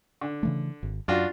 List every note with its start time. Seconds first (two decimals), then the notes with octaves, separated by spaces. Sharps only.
0.21 D3
0.43 C#3 E3 A3
0.83 G#1
1.08 F#2 D4 F4 F#4